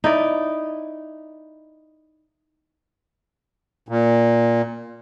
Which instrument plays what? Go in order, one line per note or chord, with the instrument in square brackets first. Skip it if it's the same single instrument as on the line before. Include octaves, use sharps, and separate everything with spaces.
[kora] D#4 E4 D5
[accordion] A#2